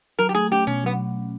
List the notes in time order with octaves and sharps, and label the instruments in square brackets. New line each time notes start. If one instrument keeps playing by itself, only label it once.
[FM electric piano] F#3 [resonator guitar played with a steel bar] A#4
[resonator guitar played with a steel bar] G4
[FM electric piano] A3 [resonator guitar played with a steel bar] G#4
[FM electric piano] C#4 [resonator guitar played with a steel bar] G4
[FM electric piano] B2 [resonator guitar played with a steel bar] C#4
[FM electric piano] F#3 [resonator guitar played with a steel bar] B3